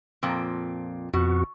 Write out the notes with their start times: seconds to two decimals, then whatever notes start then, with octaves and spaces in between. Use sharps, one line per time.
0.23 F2 A#2 C4
1.14 F2 B2 F#4